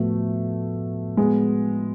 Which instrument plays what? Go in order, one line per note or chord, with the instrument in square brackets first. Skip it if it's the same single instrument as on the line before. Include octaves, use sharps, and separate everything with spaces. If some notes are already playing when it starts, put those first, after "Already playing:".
Already playing: [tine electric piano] A2 F3 B3 F#4 B4 [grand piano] A3
[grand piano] G#3 B3